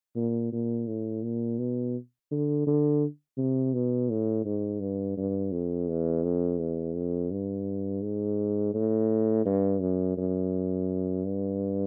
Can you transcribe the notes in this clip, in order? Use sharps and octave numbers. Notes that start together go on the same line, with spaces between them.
A#2
A#2
A2
A#2
B2
D3
D3
C3
B2
A2
G#2
G2
G2
F2
E2
F2
E2
F2
G2
G#2
A2
G2
F#2
F#2
G2